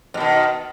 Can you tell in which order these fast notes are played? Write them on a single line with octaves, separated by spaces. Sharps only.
F2 B2 D#3